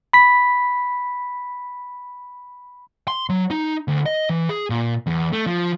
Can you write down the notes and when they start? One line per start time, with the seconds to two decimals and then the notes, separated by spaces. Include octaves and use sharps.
0.13 B5 B6
3.08 C6
3.29 F#3
3.51 D#4
3.88 D2
4.06 D#5
4.29 E3
4.49 G#4
4.70 A#2
5.07 E2
5.33 A3
5.47 F3